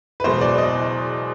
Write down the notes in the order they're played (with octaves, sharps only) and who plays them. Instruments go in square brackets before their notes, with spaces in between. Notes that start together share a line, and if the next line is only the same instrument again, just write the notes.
[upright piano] B4
F#1 E2 B2 G#3 C5
D5
D#5